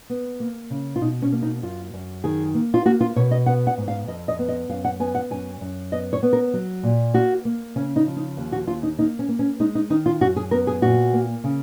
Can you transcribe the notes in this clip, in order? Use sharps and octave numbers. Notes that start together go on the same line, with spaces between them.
B3
A#3
C#3
F4
B2 D#4
C#4
A#3
D#4
F#2 F4
F#2
D#3 G#4
A#3
F4
A#3 F#4
F4
B2 C#5
D#5
B3 F#5
F#5
G#2
F5
F2 D#5
D#5
B3
D#5
F#2 F5
F#5
B3 G#5
F#5
F#2 G#5
F#2
B3 D#5
C#5
B3
A#4
F#3
A#2
A#3 F#4
A#3
C#3 C#4
D#4
F3
D#4
D#2
F#4
D#2 F4
D#4
A#3 D#4
C#4
A#3
C#4
G#3 D#4
D#4
D#3 D#4
F4
F#2 F#4
G#4
B3 A#4
G#4
A#2 F#4
A#3
C#3